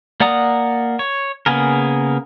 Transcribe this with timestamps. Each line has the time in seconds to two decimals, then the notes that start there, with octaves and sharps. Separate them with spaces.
0.20 A#3 D5 F#5 A#5 D#6
0.99 C#5
1.46 C#3 A#3 B3 G#4 A#4